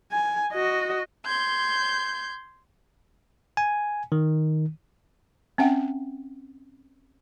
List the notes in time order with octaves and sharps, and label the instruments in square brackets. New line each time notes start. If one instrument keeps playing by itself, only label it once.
[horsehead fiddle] G#5
F#4 D#5
[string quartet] C6 G6 G#6
[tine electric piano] G#5
D#3
[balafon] C4 C#4 E5 F#5 G5